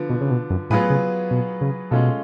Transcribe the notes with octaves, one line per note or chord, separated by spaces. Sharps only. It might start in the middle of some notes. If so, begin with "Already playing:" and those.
Already playing: D3 F3 B3
B2
C#3
B2
F#2
A2 F#3 B3 F4 G#4 B4
C#3
B2
C#3
B2 G#3 C#4 F4 A4